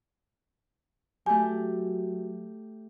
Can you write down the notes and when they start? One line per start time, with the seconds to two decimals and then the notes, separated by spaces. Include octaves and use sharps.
1.26 F#3 A3 G4 G#5